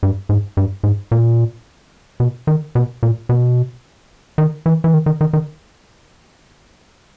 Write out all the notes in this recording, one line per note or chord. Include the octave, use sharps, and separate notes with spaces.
G2
G#2
G2
G#2
A#2
B2
D#3
B2
A#2
B2
D#3
E3
E3
D#3
D#3
D#3
D#3